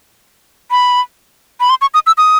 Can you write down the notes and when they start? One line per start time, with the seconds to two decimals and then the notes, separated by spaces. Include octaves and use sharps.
0.71 B5
1.60 B5
1.70 C6
1.81 C#6
1.94 D#6
2.07 E6
2.18 D#6